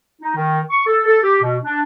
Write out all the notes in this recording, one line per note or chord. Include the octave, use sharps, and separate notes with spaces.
D#4
D#3
C#6
A4
A4
G4
B2
D4